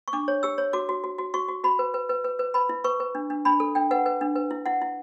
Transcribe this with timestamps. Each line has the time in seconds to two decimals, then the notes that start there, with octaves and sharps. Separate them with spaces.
0.08 C#6
0.13 D4 D6
0.28 C#5
0.43 G4 E6
0.58 C#5
0.73 F#4 D6
0.89 F#4
1.04 F#4
1.18 F#4
1.34 F#4 C#6
1.48 F#4
1.64 F#4 B5
1.79 B4
1.94 B4
2.09 B4
2.24 B4
2.39 B4
2.54 B4 B5
2.69 E4
2.84 B4 C#6
3.00 B4
3.15 D4
3.30 D4
3.45 D4 B5
3.60 A4
3.75 D4 G5
3.91 B4 F#5
4.06 B4
4.21 D4
4.35 B4
4.51 E4
4.66 E4 F#5
4.82 E4